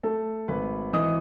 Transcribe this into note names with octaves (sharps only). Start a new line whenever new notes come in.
A3 A4 A5
G#1 B4 B5
E3 D#5 D#6